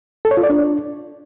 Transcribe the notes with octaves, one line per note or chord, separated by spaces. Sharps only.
A4
C#5
F4
D5
D4